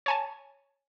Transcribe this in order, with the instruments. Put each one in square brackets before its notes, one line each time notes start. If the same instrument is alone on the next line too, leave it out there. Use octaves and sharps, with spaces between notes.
[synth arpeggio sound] C#5 G#5 A5